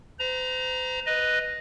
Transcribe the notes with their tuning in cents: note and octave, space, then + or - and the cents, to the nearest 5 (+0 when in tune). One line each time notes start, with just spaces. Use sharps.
C5 -40 A#5 +10
B4 +0 D#5 +0